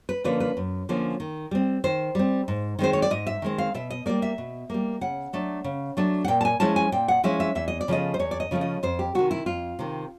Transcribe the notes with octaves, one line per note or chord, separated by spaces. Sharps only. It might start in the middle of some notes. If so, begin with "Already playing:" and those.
B4
D3 F3 A#3 C#4 B4
B4
F#2
D3 F3 A#3 C#4
D#3
G3 C4
D#3 C5
G3 C4
G#2
D#3 G#3 C4 C5
C#5
D5
G#2 D#5
E5
D#3 G#3 C4
F5
B2 E5
D#5
G3 A#3 D5
E5
B2
G3 A#3
C#3 F#5
F#3 A3 D4
C#3
F#3 A3 D4
F#5
A#2 G5
A5
G#5
F3 G#3 C#4 E4 A5
G#5
A#2 G5
F#5
F3 G#3 C#4 E4 E5
E5
E2 E5
D#5
D5
C#3 F3 A3 C#4 D#5
C5
E2 C#5
D5
D#5
C#3 F3 A3 C#4
D#5
F2 C5
G4
C3 D#3 F#4
E4
F2 F4
C3 D#3